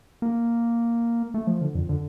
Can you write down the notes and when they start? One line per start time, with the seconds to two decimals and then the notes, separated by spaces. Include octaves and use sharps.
0.22 A#3
1.34 A3
1.47 F3
1.61 D3
1.75 F2
1.89 D3